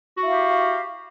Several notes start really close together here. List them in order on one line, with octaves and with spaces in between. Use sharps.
F#4 E4 F5 G4